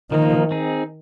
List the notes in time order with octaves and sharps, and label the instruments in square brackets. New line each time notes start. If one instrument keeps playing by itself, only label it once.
[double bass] D#3 [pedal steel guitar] F3 A#3 D#4
[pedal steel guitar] C4 D#4 G#4